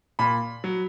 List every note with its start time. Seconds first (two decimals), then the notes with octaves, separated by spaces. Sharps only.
0.19 A#2 B5
0.64 F#3